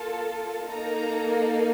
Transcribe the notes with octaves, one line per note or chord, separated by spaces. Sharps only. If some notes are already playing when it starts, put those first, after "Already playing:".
Already playing: A#3 F4 A4 A5
A#3 D#4 A4 A#5